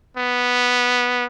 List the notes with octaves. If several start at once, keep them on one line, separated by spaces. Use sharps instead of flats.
B3